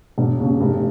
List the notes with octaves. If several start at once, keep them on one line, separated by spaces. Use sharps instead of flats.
E1
D#2 C#3
F1